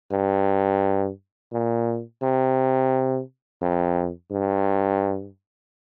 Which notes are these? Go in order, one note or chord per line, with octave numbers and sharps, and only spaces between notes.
G2
A#2
C3
F2
G2